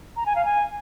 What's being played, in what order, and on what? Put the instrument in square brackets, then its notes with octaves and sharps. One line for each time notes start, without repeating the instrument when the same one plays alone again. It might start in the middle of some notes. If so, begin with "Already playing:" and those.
[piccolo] A#5
G#5
F5
G#5